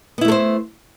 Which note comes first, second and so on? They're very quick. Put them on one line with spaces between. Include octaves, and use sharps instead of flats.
B3 E4 A3 A4 C5